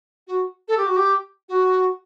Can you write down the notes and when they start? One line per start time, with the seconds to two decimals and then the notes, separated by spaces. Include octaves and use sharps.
0.27 F#4
0.68 A4
0.77 G4
0.86 F#4
0.96 G4
1.49 F#4